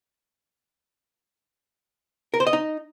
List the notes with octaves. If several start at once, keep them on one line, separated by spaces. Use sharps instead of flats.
A#4
C5
D#5
D#4